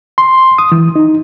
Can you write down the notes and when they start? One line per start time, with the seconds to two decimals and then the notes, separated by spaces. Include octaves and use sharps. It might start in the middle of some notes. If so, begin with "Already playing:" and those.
0.18 C6
0.58 D#6
0.72 E3
0.96 D#4